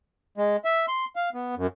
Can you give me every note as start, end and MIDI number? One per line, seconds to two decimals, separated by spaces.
0.38 0.56 56
0.65 0.86 76
0.88 1.05 84
1.16 1.29 77
1.34 1.55 59
1.56 1.67 42